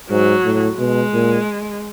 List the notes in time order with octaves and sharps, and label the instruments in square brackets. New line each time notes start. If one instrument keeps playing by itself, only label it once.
[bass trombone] G#2 [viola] F#3
[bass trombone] A2
[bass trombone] B2 [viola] G#3
[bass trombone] A#2